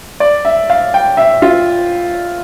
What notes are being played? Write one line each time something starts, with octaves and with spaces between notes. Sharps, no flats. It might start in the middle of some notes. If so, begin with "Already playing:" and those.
D5
E5
F5
G5
E5
F4